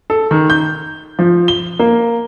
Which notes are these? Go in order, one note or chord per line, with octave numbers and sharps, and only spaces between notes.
A4
D#3
G6
F3
G7
A#3